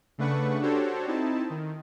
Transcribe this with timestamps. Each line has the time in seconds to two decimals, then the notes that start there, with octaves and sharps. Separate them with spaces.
0.18 C#3 A3 D4 B4 F#5 C#6
0.61 D4 F#4 G4 A4 C5 C#5
1.07 C4 D#4 E4 A5
1.50 D#3